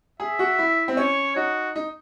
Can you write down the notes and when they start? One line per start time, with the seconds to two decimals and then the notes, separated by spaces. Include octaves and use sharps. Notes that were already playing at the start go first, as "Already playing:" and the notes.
0.20 G#4 E5
0.39 F#4
0.58 E4
0.88 C4
0.97 C#4 C#5
1.36 D#4 F#4
1.76 D#4